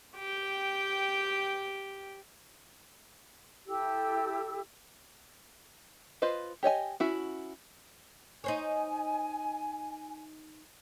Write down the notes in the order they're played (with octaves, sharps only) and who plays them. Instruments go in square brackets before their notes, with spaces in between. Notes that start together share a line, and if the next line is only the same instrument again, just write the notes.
[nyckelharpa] G4 G5
[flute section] E4 G4 A4 E6
[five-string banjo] F4 B4 C5 D#5
G4 C#5 D#5 G#5
C#4 E4 F#4
[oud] D#4 C5 C#5 [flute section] G#5